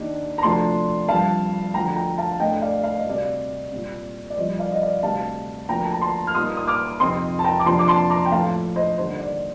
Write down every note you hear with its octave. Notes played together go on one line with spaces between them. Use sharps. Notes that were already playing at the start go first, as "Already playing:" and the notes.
Already playing: D#2 D#3 A#3 D4
A#5
D2 C3 F3 A3 D4 A5 C6
G2 F3 C4 F5 A5
D2 D3 F3 G5 A#5
G5 A#5
F5 A5
A2 A3 D4 D#5 G5
D5 F5
F5
D#5
D2 C3 G3 C4 D5 F5
A#2 G3 C4
D5
C2 C3 F3 C5 D#5
D5 F5
D#5
D5 F5
D2 C3 G3 F5 A5
D2 D3 F3 A#3 G5 A#5
A5
A#5
A5 C6
F6
A#2 G3 A#3 D#4 C6 D#6
D#6
D6 F6
F2 C3 F3 C4 D#4 C6 D#6
A5
G5 A#5
D6
F2 C3 F3 A#3 D4 A5 C6
D6
A5 C6
A#5 D6
G5
A2 F3 A3 F5 A5
C5 D#5
D#2 D3 G3 A#3 C5
D5